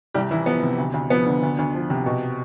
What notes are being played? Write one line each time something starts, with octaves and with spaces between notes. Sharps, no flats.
C2 G3 G4
C2 E3 E4
F3 B3
C3
D2
D2
F3 B3
D3
D2
D2
F3
C3
B2